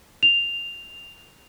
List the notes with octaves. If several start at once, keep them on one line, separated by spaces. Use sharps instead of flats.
F7